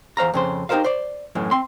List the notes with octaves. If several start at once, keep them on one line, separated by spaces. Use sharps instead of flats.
E2 C5 F5 A#5
F2 C#3 C5
D#4 G4 A4 A#4 C5 F5
C5 D5
F#2 A2 E3
C4 C6